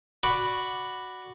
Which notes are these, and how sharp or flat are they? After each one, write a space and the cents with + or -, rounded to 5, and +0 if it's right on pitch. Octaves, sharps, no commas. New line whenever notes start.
F#4 +0 D5 +0 B5 +0